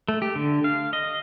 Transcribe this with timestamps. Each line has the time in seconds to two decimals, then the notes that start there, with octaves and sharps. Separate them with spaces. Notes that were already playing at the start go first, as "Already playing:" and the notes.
0.08 A3
0.22 G4
0.36 D3
0.64 F5
0.93 D#5